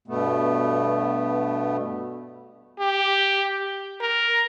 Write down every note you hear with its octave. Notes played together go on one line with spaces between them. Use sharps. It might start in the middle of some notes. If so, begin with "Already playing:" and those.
G2 B2 A3 B3
G4
A#4